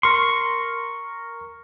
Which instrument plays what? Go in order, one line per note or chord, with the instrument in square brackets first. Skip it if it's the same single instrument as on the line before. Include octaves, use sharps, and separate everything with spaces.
[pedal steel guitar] A#4 C6 [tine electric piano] C#6